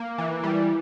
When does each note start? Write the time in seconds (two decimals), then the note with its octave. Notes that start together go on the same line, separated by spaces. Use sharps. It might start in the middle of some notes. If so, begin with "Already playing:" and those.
Already playing: A#3
0.18 E3
0.43 G3